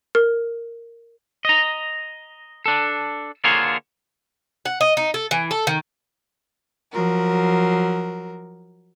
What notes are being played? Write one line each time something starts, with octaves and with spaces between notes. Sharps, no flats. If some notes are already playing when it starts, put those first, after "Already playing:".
A#4
D#5 A#5
D4 A4
D3 A#3 F4 G#4 C5 C#5
F#5
D#5
D#4
A4
E3
A4
D#3
F3 F#3 A#4